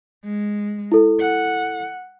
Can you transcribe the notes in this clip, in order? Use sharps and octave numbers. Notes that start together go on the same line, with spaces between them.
G#3
E4 A4
F#5